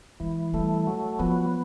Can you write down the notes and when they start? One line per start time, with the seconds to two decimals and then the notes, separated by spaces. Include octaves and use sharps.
0.20 E3 G#3
0.53 G3 A3
0.87 F#3
1.19 F3 B3